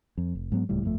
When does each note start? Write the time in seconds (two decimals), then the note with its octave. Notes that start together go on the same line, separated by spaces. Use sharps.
0.17 F2
0.35 F1
0.52 G#2 F#3 B3
0.69 D1 C#2 A2 G3
0.83 G1 F2 A3